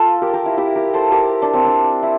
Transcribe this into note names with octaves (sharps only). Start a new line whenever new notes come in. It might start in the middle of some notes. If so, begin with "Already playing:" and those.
Already playing: F4 A4
G4 A#4
G4 A#4
E4
E4 G4
G4 A#4
A4 C5
G4 A#4
D4
C4
D4
E4